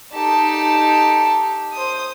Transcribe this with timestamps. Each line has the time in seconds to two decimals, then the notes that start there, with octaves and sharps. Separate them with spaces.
0.14 D#4 G4 A4 A5
1.74 C5 D#6